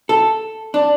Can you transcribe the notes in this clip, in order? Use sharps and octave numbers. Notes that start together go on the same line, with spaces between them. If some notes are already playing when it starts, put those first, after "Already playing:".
A4
D4